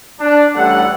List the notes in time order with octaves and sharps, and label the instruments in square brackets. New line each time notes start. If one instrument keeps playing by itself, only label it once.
[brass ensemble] D4
A1 G3 A4 F#5